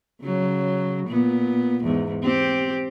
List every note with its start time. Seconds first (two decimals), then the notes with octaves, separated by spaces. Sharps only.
0.22 C#3 F#3
1.08 A#2 B3
1.84 E2 G#2
2.23 C4 G4